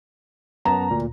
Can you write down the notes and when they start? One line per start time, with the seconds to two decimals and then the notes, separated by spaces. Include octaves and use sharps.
0.65 F#2 B3 A5 A#5
0.91 D2 A#2